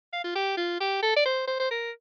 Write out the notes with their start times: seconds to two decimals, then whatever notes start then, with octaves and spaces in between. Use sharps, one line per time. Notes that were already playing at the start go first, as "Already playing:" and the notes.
0.13 F5
0.24 F4
0.35 G4
0.57 F4
0.80 G4
1.02 A4
1.16 D5
1.25 C5
1.48 C5
1.60 C5
1.71 A#4